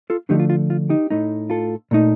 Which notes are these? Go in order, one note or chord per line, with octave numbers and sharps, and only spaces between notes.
F4 A4
D3 F3 A3 D4 D#4 G4
F4
F4
F4
D#4 G4
A2 A3 D#4
F4 A4
A#2 A3 D#4